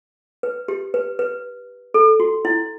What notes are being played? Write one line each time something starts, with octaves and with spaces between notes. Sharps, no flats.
B4
G4
B4
B4
A4
F#4
E4